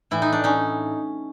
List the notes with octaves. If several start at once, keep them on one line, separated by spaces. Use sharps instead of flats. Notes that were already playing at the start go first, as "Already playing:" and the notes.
A2 E3 E4
D#4
D4
C#4 D#4